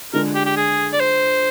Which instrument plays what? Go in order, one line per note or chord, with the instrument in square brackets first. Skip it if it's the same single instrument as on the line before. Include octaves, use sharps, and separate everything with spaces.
[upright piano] D3 G#3 D4 F4 [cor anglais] A#4
[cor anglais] G4
G4
G#4
D5
C5